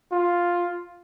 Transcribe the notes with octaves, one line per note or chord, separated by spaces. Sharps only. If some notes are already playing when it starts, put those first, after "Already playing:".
F4